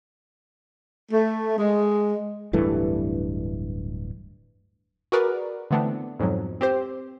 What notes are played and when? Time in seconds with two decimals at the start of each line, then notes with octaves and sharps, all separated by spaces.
1.12 A3
1.59 G#3
2.53 D1 G2 E3 A3
5.12 F#4 G#4 A#4 B4 D5
5.71 D3 E3 A3 B3 C4 D4
6.19 F2 G#2 B2 F3 F#3
6.61 C4 G4 C5